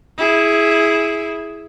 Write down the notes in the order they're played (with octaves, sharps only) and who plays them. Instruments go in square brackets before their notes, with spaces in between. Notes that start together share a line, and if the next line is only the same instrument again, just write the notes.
[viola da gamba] E4 G#4